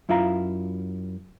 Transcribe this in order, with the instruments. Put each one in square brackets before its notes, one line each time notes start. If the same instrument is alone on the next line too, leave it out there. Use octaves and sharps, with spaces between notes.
[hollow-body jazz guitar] F#2 E4 F4 F5 A#5